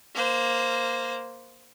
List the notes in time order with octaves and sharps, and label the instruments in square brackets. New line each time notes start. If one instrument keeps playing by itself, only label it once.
[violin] A#3 C5